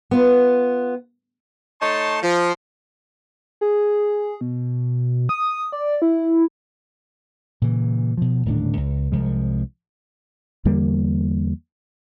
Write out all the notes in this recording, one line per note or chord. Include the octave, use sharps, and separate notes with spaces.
B3 F4
A3 D#4 C#5 A5 C6
F3
G#4
B2
D#6
D5
E4
A#2 C#3 E3
B2 F3
D#1 A2 D3 D4
C#2
C2 F3 G#3
E2 D3 G3 A#3